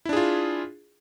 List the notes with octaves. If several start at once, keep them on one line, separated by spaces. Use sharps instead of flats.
D4 E4 F4 G#4